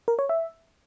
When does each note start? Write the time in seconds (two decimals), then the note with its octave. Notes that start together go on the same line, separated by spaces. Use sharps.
0.08 A#4
0.19 C#5
0.29 E5